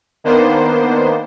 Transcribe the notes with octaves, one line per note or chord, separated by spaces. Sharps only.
D#3 A#3 B3 D4 C5